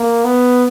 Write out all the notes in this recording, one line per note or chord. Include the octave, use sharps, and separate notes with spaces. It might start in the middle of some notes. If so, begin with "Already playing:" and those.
Already playing: A#3
B3